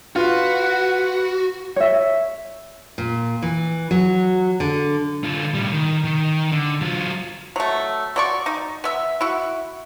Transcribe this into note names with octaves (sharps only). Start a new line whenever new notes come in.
F4 F#4 B4
C#5 E5
A#2
E3
F#3
D3
D3 F4
A2 G3
D#3
D#3
D3
F#3 F4
F#3 A3
F#3 D5 C#6
D#4
B3 E5
E4 F#4